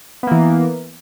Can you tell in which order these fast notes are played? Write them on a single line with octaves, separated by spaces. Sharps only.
B3 A#3 E3